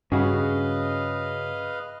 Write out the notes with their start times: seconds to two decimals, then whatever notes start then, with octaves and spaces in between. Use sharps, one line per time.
0.12 G2 C#3 F#4 G#4 B4 D#5 F5